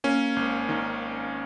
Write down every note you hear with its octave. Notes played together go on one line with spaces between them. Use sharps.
A#3 C#4
G#1
D#3